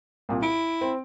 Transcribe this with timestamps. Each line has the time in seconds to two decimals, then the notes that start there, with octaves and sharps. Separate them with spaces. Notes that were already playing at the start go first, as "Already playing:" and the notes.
0.29 C2 A#2
0.43 E4 D7
0.81 C4